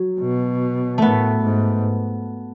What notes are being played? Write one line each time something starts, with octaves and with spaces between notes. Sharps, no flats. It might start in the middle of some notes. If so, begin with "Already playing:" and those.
Already playing: F#3
B2
A2 A3 B3
G#2